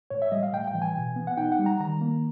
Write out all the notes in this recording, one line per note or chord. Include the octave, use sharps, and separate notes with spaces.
A2 C#5
E5
G3 D#5
F5
A2 G5
G5
E3
G#5
B2
B3
F#5
D#4 G5
F#5
G3
A#5
D#3 A#5
A#3